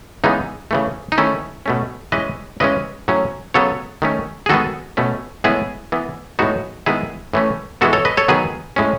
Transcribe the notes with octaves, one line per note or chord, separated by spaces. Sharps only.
C#3 E3 G#3 B3 D#4
C#3 E3 A3
D#4
D#3 A3 C#4 E4
B2 A3 C#4
E3 G#3 C#4 B4 D#5
C#3 E3 G#3 C#4 B4 D#5
A2 F#3 C#4
C#3 F#3 B3 A4 C#5
D#3 A3 C#4
G#4
D#3 G#3 B3 F#4 A4
B2 A3 C#4
A2 G#3 B3 E4 G#4
E3 B3
A2 G#3 B3 D#4 F#4
D#3 G#3 B3 E4 G#4
A2 E3 A3 C#4
E3 G#3 B3 F#4 A4
A4 C#5
B4 D#5
A4 C#5
D#3 F#3 B3 G#4 B4
A2 G#3 C#4